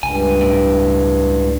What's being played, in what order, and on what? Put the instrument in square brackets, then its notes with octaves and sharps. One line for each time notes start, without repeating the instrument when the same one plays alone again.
[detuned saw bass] C#2 [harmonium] G2 [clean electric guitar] G#5
[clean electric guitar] A2